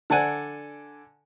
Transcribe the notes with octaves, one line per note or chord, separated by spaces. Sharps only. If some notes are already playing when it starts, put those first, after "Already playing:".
D3 A4 D5 F#5 G#5